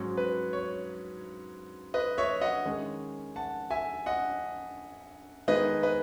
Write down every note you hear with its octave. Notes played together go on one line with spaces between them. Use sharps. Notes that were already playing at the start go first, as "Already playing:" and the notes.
Already playing: G#2 F#3 C#4
B4
C#5
B4 D#5
C#5 E5
D#5 F#5
D#3 G#3 C#4
F#5 A5
E5 G#5
D#5 F#5
D#3 G#3 B3 D#4 B4 D#5
B4 D#5